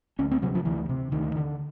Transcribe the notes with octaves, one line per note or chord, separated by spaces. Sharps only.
D2 C#4
C4
C3 F#3
F3
D2 E3
C3
D2 D#3
D3